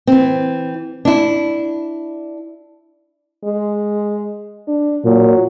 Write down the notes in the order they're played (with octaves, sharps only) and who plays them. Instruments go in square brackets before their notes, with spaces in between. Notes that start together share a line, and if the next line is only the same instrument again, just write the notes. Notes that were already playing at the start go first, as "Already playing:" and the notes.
[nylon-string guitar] E3 C4
D4 E4
[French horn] G#3
D4
[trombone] A#2 [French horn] F#3